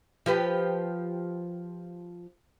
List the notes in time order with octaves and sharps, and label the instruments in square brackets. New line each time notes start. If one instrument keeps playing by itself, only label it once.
[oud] F3 G4 B4